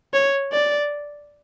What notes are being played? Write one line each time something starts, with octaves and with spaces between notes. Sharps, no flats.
C#5
D5